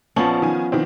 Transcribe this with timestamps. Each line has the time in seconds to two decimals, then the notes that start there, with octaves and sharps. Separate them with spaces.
0.16 A#1 F3 B3 C#4 A5 F#7
0.42 D#3 G#5
0.72 D#3 E3 C4